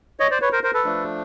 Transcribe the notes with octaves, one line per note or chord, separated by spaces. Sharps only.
C#5 D#5
C5 D5
B4 C#5
A#4 C5
A#4 C5
A4 B4
F3 A3 D4